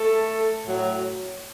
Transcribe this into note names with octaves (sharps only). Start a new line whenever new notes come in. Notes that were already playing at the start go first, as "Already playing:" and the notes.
Already playing: A3 A4
A2 F#3